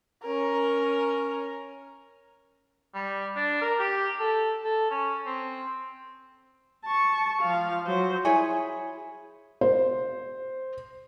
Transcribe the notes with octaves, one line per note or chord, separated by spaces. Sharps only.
C#4 A#4
G3
D4
A#4
G4
A4
A4
C#4
C4
A5 C#6
F3 F5
F#3 C5
E4 G#4 C#5 G#5
C5